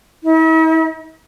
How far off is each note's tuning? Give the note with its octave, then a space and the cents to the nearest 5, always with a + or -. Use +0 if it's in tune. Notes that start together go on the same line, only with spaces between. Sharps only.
E4 -45